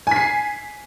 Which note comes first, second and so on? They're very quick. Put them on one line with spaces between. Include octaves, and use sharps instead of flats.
G#5 B6 C7